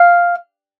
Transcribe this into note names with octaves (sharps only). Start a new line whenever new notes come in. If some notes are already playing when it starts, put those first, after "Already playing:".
Already playing: F5